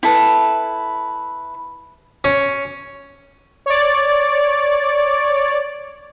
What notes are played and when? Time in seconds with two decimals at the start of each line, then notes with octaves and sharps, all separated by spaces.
0.03 E4 A4 B4
2.24 C#4
3.66 C#5 D5